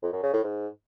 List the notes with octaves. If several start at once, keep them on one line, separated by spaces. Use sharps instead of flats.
F2
F#2
C#3
A2
G#2